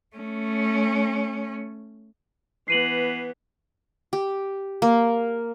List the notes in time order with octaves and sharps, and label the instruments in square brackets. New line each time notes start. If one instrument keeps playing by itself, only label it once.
[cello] A3 C#4
[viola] E3 B3 [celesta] C7 D#7 F#7
[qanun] G4
A#3